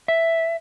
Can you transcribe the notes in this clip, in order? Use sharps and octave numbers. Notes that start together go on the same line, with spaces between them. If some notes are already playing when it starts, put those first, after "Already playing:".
E5